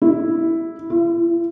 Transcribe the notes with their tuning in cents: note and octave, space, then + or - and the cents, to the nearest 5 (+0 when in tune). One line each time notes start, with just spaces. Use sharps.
E4 -5
E4 +45